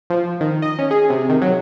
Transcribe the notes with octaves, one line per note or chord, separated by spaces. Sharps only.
F3
D#3
D#5
C#4
G#4
C3
D#3
F#3